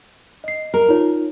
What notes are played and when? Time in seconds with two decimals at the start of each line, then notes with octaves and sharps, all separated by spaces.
0.44 D#5 C7
0.74 A#4
0.88 D#4 F4 C#5